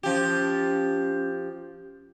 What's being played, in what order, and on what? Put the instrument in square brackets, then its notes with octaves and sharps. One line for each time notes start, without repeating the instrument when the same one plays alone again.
[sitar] F3 G4 [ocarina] C#4